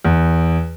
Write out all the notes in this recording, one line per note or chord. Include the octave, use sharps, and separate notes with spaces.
E2